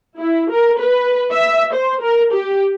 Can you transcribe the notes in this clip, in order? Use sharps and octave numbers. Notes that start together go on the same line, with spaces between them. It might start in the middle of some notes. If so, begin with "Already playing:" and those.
E4
A#4
B4
E5
C5
A#4
G4